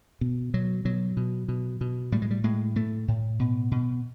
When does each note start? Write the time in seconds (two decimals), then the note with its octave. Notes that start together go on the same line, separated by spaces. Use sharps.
0.21 B2
0.54 B2 F#3
0.85 B2 F#3
1.17 B2
1.48 B2
1.81 B2
2.12 A2 G3
2.22 G#3
2.31 G3
2.44 A2 G#3
2.76 A2 A3
3.08 A2
3.39 B2
3.71 B2